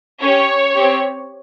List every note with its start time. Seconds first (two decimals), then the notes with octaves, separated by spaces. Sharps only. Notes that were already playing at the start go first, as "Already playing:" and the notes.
0.22 C#4 G4 C#5
0.75 C4 G4